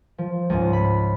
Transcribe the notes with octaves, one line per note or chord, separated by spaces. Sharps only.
F3
C#2 G#2
B5